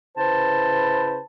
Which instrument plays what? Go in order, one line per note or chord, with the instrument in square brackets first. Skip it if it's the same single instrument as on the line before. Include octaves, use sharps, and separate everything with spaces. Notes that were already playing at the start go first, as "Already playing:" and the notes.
[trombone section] C#3 E4 B4 [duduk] C5 [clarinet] A5